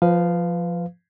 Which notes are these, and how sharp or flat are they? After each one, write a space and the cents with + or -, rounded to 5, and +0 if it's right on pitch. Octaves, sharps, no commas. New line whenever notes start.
F3 +0 B4 +25 F5 +0